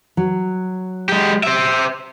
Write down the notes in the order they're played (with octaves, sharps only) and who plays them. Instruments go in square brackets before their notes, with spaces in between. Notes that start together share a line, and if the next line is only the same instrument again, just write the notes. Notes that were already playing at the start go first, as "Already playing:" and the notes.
[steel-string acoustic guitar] F#3
[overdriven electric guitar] G#3 G4
C5 E5